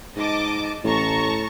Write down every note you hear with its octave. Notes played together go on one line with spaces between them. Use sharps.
G#2 D#5 A5 D6
A1 A2 A5 A#5 C#6